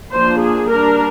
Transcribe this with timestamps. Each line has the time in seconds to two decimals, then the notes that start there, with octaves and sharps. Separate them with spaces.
0.11 F3 A#3 D4 C5
0.41 G#4
0.70 G3 D4 A#4